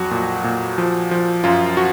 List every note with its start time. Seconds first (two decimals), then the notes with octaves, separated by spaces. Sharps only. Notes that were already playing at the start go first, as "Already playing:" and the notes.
Already playing: F2 F#3 F#4
0.11 A#2
0.44 A#2
0.78 F3
1.11 F3
1.44 F#2 F4
1.77 F#4